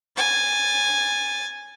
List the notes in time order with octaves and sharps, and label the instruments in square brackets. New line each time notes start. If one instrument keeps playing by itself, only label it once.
[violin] G#5 A6